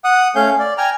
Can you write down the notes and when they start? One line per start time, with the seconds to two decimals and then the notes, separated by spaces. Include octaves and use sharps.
0.04 F#5 D#6
0.35 A3 C#4 F5 G6
0.59 D5
0.78 G5 G#5 A#5 F6